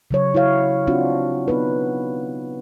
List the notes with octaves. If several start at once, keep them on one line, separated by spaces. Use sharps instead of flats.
C#3 F#3 C#5
E4 F#4 C#5 F5
C4 D4 F4 F#4
B3 D#4 B4